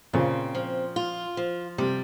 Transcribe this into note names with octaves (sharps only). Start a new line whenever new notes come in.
A#2 C#3 C4
F3
F4
F3
C3 G3